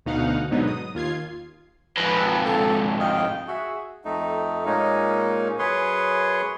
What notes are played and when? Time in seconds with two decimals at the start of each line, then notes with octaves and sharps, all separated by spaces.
0.06 D2 B2 D#4 F5 F#5
0.51 G#2 B2 D3 F#3 B3 D#4
0.67 D#6
0.95 D#2 F4 G#6 C7
1.97 F2 G#2 B4
2.46 A4
3.00 D#5 F5 G5
3.47 F#4 G#4 E5
4.05 F2 A3 D#4
4.66 A#2 G#3 A#3 C#4 D#4
5.59 F#2 G#4 B4 C#5 C6